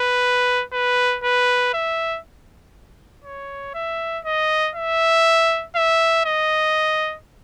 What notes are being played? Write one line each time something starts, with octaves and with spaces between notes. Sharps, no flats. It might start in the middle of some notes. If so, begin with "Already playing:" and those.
Already playing: B4
B4
B4
E5
C#5
E5
D#5
E5
E5
D#5